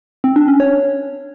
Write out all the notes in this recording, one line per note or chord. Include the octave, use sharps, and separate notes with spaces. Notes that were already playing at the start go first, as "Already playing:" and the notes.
C4
D4
C#4
C#5